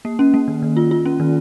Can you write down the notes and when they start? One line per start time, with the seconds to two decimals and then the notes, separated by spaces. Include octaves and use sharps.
0.05 A#3
0.19 C#4
0.34 A#3
0.48 D#3
0.62 D#3
0.77 F4
0.91 F4
1.06 C#4
1.20 D#3